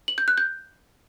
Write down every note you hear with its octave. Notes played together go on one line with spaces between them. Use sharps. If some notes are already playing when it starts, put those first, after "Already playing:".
F#7
G6
F#6
G6